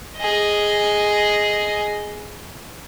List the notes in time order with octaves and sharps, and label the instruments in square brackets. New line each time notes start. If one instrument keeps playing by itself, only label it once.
[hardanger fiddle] G#4 D#5